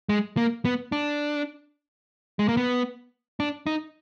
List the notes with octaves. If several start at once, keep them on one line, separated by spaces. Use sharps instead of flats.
G#3
A#3
B3
D4
G#3
A#3
B3
D4
D#4